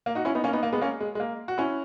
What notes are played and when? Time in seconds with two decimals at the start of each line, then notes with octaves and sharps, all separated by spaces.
0.06 A#3
0.15 D#4 F#4
0.25 C#4 E4
0.35 B3 D#4
0.44 A#3 C#4
0.53 B3 D#4
0.63 A#3
0.72 G#3 B3
0.81 A#3 C#4
1.00 G#3
1.15 G#3
1.20 A#3
1.48 F#4
1.58 C#4 E4